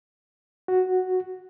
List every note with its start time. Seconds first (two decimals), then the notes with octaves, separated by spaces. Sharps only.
0.68 F#4